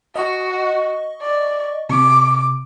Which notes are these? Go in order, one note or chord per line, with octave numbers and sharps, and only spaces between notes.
F#4 D#5 C#6
D5
C3 D6